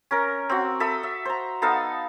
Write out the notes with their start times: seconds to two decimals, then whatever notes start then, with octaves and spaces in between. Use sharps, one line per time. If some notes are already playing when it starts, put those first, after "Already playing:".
0.11 C#4 A#4
0.49 C4 F#4
0.80 A4 E5 B5 D#6
1.03 E5
1.25 C5 A#5
1.62 B3 D#4 A4 F5